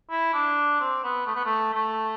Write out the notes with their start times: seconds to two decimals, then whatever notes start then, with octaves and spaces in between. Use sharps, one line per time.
0.10 E4
0.33 D4
0.80 C4
1.04 B3
1.26 A3
1.35 B3
1.45 A3
1.73 A3